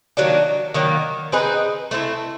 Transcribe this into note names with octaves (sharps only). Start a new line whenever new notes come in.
D#3 F#3 A#3 D4
D#3 F#3 A#3
C4 D#4 G#4 B4
A3 C4 E4